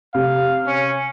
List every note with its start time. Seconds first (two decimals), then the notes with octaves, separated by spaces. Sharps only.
0.15 C3 F5
0.67 C#4